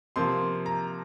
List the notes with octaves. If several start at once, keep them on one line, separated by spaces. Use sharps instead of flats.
C3 F3 A#3 C6
A#5